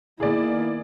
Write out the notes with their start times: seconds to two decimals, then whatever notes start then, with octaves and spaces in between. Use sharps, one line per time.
0.20 D#3 A#3 B3 E4 G#4 D5